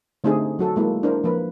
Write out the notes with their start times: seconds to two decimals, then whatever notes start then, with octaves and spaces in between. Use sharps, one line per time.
0.24 D3 A3 C4 D#4 G4 G#4
0.59 F#3 F#4 A4
0.76 G#3 A#3 E4
1.03 D4 E4 A#4 C5
1.24 F3 A#3 A#4 B4